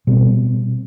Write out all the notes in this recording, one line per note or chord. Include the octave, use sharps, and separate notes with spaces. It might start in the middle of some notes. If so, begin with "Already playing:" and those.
B2 G3 C4